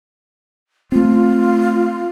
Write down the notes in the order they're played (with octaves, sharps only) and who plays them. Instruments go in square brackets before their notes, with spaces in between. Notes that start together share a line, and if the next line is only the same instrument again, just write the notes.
[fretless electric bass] A3 C4 [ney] F4